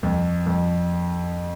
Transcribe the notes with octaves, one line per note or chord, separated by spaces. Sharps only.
F2
F2